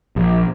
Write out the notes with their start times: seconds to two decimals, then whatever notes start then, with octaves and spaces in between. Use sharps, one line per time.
0.16 A#1